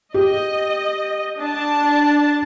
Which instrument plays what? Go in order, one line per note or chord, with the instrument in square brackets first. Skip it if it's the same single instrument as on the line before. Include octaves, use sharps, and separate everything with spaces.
[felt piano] G4 [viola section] D#5
[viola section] D4 A5